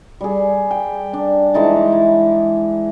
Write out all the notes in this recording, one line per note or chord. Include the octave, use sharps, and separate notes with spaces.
G3 G#4
G5
D4
E3 G#3 D#4 A5
E4